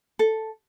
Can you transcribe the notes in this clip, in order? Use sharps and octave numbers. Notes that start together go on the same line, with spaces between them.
A4